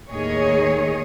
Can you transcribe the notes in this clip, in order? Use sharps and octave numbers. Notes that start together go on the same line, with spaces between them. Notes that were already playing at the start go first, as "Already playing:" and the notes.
D#2 A2 D#3 G#4 C#5 D#5